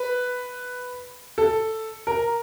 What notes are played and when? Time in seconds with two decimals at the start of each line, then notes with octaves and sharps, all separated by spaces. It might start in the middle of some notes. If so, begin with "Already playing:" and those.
Already playing: B4
1.38 A4
2.07 A#4